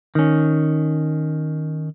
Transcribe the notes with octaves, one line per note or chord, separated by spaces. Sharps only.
D#3 C#4